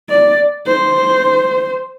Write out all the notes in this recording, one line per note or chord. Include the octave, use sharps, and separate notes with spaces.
D5
C5